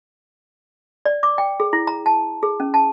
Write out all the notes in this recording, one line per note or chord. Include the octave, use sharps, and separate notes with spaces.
D5
D6
G5
G#4
E4
A#5
A5
G#4
C#4
A5